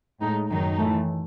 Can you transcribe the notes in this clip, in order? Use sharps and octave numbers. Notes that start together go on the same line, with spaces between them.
A2 G#3 D#4
F#2 D#3 F#3 D#4
A2 E3 A3